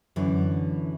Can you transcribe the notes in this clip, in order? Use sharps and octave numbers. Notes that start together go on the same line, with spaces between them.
F#2 D3 E3